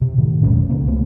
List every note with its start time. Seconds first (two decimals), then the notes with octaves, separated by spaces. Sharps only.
0.01 C3
0.18 A2 D#3
0.43 F1 B1 G#3 C#4
0.69 C2 C#3 A#3
0.88 C#2 A3 B3